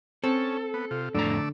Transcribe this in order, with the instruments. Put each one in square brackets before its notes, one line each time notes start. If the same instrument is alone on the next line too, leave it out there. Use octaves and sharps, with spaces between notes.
[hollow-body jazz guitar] C4 [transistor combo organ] C#4 [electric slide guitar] A4
[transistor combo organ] B3
C3 F4
[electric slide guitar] F2 A2 A#5 [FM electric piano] D3 [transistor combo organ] A3 D5 E6